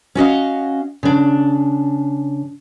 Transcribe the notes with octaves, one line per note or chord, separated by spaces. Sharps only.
C#4 F#4 D#5 F5
C#3 D4